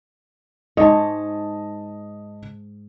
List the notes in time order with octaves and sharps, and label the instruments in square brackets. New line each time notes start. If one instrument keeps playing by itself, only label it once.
[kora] G#2 C#5 [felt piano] D#5 A5